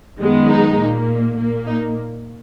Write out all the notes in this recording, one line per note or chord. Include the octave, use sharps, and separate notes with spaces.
F#2 D#3 G#3 B3
D#4
A#2 A#3
A#2 A#3
D#4